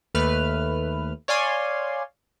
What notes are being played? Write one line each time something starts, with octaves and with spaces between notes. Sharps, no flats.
D#2 A3 B4 F6
C#5 D5 F5 G#5 C6